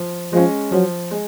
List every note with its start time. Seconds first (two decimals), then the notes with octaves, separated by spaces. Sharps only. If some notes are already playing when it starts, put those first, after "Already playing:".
Already playing: F3
0.33 F3 G#3 C#4
0.72 F3 F#3
1.11 G#3